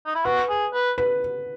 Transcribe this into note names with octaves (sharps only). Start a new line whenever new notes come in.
D#4
E4
F#4 B4
G#4
B4
B4